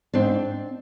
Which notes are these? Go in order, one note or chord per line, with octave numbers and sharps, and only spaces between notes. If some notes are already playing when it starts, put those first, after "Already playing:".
G#2 C4 D4